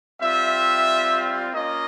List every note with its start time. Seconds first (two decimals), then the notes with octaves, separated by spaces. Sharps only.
0.21 G3 C4 F4 E5
1.53 A#3 C#4 F4 D#5